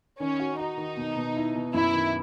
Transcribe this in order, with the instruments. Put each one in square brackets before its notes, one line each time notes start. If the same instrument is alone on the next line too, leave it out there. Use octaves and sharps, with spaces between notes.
[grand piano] D#3 [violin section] C#4
[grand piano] F#4
[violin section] D#4 [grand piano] F#4
[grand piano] D#3
B2
B2
E4
B2
[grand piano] F#2 [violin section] E4
[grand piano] D#3